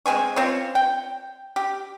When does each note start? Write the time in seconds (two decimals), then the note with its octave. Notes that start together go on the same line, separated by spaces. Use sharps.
0.06 G#3 C4 G#5 C#6
0.36 C4 F4 C#5
0.75 G5
1.56 G4